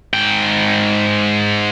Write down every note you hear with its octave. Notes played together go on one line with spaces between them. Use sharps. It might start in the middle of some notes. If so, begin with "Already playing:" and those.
G#2 G5